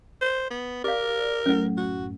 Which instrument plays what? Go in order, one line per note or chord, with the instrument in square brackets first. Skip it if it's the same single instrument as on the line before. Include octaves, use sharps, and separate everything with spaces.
[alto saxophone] C5
B3
[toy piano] G4 F5 [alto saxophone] A#4 [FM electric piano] D5
[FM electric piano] F#2 A2 [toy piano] C#4 F#5
[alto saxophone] F#4